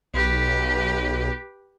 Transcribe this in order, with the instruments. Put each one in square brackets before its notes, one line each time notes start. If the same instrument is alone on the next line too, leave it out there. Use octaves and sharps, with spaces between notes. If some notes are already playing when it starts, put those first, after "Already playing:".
[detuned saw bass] B1 [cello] G4 B4